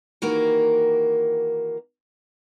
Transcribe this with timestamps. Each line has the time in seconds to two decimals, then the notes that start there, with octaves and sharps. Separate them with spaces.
0.22 D#3 E3 A#3 F#4 G4 A#4